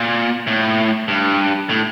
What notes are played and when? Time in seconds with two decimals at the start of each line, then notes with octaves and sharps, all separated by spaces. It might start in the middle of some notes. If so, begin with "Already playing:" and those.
Already playing: A#2
0.47 A2
1.08 G2
1.69 A2